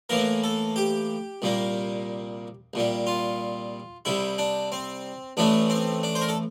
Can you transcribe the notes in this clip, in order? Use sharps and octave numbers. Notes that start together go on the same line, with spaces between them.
A2 E3 A#3 A#4
A4
G4
C2 A#2 G3 A#3
C2 A#2 G3
F4
C2 C3 G3 E4
D4
C4
A1 A2 E3 A3 D4
C4
D4
C5
A#4
A4